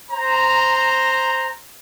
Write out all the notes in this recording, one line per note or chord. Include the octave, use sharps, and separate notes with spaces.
C5 A#5